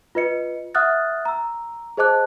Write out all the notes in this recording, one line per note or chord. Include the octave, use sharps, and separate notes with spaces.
F4 B4 D#5 C#7
E5 F#5 D#6 F6 F#6 A6
A#5 E6
G#4 C5 D#5 A5 D6 F#6